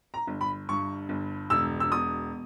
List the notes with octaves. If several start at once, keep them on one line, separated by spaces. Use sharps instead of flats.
A#5
G1
B5
G2 C#6
G1
E1 E6
E6
B2 D#6